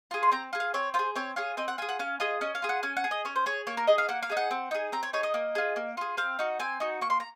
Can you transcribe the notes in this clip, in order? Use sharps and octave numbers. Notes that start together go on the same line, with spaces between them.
F4 G#4
C6
C4 A#5
F4 G#4
F5
C4 C#5
F4 G#4 C5
C4 C#5
F4 G#4 C#5
C4 D#5
F#5
F4 G#4 G#5
F#5
C#4 F5
F4 G#4 D#5
C#4 D#5
F5
F4 G#4
F#5
C#4 G#5
F#5
G#4
D#5
C#4 C#5
C5
G#4 C#5
A#3 C#5
A#4
D#4 G#4 D#5
F5
A#3 F#5
F5
D#4 G#4
F#5
C4
D#4 G#4
C4 A#5
C#5
D#4 G#4 C#5
D#5
A#3
F4 G#4
A#3
F4 G#4
C4 F5
D#4 F#4
C4 G#5
D#4 F#4
A#3 C#6
C6
A#5